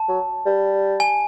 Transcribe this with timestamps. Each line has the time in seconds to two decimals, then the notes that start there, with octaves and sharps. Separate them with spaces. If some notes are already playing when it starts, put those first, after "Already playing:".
Already playing: A5
0.08 F#3
0.46 G3
1.00 G#5